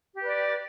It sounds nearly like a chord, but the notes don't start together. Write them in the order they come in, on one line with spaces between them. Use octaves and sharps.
G4 B4 D5